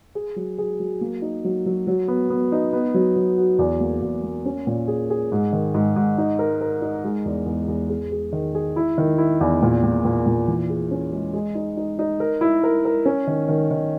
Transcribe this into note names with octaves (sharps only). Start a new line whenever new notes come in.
G#4
F#3
G#4
F#3
A#3
D#4
F#3
F#3
F#3
B3
B3
D#4
B3
F#3
F#3
F#4
E2
A#3
E2
A#3
C#4
A#2
G#4
G#4
G#2
D#3
G#2
G#2
D#4
A#4
A#4
D#4
G#3
E2
E2
E2
G#4
G#4
D#3
G#4
E4
D#3
E4
E2
A#2
A#2
A#2
A#2
E3
G#4
C#4
G#3
G#3
D#4
D#4
D#4
A#4
E4
A#4
A#4
C#4
D#3
D#3
D#3